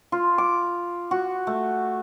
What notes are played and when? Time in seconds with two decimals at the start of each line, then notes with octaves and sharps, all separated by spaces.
0.12 F4
0.38 D6
1.11 F#4
1.47 A3